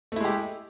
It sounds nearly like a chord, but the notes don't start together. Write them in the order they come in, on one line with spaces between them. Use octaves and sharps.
A3 E4 G#3 G4